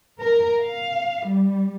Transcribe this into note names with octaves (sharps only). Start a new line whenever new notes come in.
A#4
F5
G3